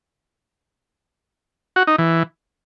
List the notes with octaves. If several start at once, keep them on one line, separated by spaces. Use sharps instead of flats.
F#4
D#4
E3